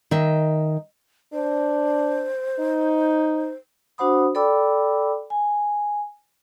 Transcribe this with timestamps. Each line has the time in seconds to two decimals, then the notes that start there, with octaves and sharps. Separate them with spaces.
0.11 D#3 D#5 E5
1.34 D4 C5
2.60 D#4
3.98 D4 F#4 C5 F#5 B5 D#6
4.35 A4 D5 G5 B5 D6 E6
5.30 G#5